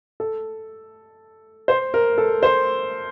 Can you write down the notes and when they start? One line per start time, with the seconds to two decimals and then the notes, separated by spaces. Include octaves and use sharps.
0.20 A4
1.68 C5
1.94 A#4
2.18 A4
2.43 C5